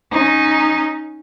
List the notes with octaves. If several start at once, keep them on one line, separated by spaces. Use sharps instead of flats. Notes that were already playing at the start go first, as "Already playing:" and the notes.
C#4 D#4